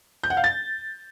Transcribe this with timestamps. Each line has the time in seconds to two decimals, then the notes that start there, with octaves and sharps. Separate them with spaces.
0.24 G6
0.30 F#5
0.37 F5
0.44 A6